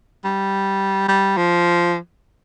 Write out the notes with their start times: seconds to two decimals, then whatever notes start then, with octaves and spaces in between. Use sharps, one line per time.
0.24 G3
1.08 G3
1.37 F3